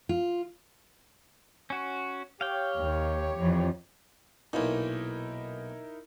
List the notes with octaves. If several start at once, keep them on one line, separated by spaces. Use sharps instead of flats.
F4
C#4 F#4
G4 C#5 F5 G5
D#2
F2 E3
B1 A#2 D#4 E4 A#4